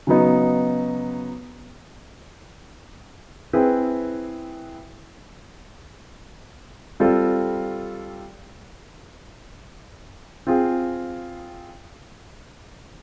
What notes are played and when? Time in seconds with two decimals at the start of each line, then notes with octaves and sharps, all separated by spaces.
0.07 C#3 F#3 B3 D#4
3.53 C4 E4 G#4 B4
7.00 G3 C4 F4 A4
10.47 C4 F4 G#4